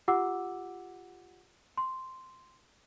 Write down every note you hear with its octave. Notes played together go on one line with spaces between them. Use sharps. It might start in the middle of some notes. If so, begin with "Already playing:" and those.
F4 G4 F#5 D6 E6
C6